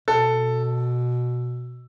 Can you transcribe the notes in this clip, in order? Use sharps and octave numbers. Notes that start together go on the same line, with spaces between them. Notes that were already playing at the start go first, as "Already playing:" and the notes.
B2 A4